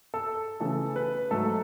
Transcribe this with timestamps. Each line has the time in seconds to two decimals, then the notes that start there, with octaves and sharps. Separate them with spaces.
0.14 A4
0.60 C#3 E3 A3 A4
0.96 B4
1.31 G#2 F#3 A3 A4